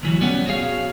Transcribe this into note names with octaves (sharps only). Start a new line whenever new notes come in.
D2 E3 F#3
B1 G3 B3 C#4 C#5 F#5
F#4 G#4 C#5 D#5 F5